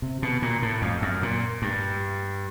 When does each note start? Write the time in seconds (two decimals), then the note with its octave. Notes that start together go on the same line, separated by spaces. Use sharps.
0.02 C3
0.22 B2
0.42 A#2
0.62 A2
0.82 F2
1.02 F#2
1.23 A#2
1.62 G2